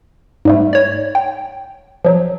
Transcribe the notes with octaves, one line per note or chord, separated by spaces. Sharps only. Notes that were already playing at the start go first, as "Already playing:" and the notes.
G#2 G3 A3
C#5 D5
G5
F3 F#3